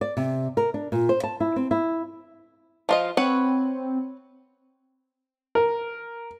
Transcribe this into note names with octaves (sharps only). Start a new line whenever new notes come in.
D5
C3
A#4
D4
A#2
C5
A5
E4
C4
E4
F3 F4 D#5 F5
C4 B4 C#5 F#5
A#4